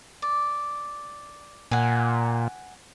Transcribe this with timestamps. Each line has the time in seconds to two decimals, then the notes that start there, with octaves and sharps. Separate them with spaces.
0.22 D5
1.71 A#2 F#5 G#5